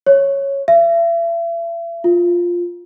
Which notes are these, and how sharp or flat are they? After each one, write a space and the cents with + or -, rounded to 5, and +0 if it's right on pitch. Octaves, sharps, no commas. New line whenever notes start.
C#5 -5
E5 +40
F4 +5